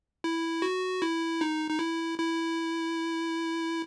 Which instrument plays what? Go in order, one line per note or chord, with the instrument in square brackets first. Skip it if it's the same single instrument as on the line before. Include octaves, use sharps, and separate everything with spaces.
[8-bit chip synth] E4
F#4
E4
D#4
D#4
E4
E4